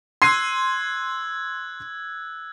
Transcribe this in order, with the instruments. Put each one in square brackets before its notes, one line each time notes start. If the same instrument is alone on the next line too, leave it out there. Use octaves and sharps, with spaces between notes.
[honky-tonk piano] C6 C7 D#7 [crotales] E6 F#6 G#6